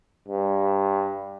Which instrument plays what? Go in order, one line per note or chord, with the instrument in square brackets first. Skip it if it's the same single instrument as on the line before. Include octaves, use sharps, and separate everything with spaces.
[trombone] G2